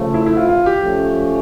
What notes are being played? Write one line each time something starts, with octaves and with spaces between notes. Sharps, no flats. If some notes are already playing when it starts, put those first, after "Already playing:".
Already playing: C#3 F3 A3
E4
E4
F4
F4
G4
F3 A3 C#4